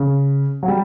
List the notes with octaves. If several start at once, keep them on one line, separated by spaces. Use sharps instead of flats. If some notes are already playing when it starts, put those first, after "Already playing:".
Already playing: C#3
F#3
G3